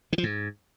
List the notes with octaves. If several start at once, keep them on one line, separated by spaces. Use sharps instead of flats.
D#3
F3
G#2